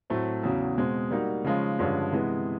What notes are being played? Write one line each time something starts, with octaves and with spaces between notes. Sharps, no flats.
A2 F#3 A3 C4
E2 C#3 F#3
B2 G#3 C4
G3 A#3 D#4 F#4
C#3 F3 G#3 C#4 F4
G2 D3 F3 G#3 C#4
C3 E3 G#3 B3